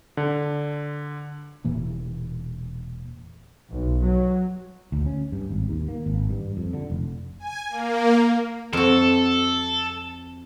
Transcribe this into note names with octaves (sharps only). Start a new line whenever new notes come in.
D3
E1 A#2 E3 A#3
B1
F#3
D2
C#4
G2
G#1
D#2
A#3
G#1
G2
F2
D3
F1
G#5
A#3
F2 F#4 A4